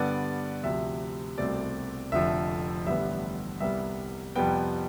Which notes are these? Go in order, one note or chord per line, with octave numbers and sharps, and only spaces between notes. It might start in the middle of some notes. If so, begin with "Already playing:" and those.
Already playing: G2 D3 G3 B3 D5
D2 C3 F3 E5
C2 B2 A3 C4 D5
F1 F2 D3 F3 E5
A1 G2 D3 G3 B3 E5
C2 C3 G3 B3 E5
F2 C3 G3 B3 G5